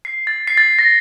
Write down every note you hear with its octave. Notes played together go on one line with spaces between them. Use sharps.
C7
A6
C7
A6
A#6